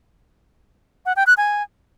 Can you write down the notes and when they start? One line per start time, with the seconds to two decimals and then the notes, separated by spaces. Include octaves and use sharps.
1.06 F#5
1.16 G5
1.27 F#6
1.37 G#5